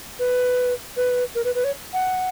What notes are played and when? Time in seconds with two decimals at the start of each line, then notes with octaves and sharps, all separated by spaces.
0.19 B4
0.96 B4
1.35 A#4
1.44 B4
1.55 B4
1.64 C#5
1.93 F#5